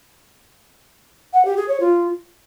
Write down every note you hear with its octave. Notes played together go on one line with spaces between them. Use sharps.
F#5
G4
G#4
C#5
F4